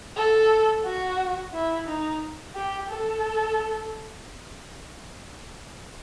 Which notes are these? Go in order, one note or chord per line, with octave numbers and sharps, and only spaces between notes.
A4
F#4
E4
D#4
G4
A4